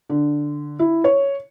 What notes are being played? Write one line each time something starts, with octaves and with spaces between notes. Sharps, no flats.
D3
E4
C#5